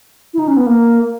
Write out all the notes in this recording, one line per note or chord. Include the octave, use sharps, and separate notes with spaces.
E4
D#4
C#4
B3
A#3